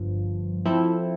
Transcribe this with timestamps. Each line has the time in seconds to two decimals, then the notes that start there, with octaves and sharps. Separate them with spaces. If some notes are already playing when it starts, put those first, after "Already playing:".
Already playing: G1 G2 F3
0.65 F3 C4 E4 A4